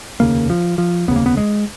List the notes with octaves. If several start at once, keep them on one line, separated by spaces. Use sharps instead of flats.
F1 D#2 C#3 A#3
F3
F3
F1 D#2 C#3 B3
A#3
B3
G#3